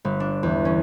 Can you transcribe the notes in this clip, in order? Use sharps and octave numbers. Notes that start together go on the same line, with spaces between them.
G1
D4
E2
C#4